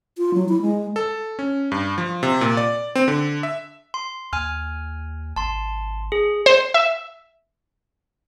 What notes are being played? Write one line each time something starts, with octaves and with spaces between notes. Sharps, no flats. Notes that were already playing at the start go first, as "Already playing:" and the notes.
F4
F#3
E4
G#3
A4
C#4
G2
F3
C3
A#2
D5
C4
D3
E5
C6
D#2 G#5 F6
G#1 A5 C6
G#4
C5
E5